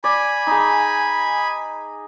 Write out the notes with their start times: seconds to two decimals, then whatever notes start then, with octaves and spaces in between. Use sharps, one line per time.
0.04 D5 G#5 B5
0.47 D#4 G#4